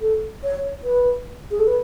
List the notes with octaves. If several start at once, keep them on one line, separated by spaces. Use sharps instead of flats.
A4
C#5
B4
G#4
A4
B4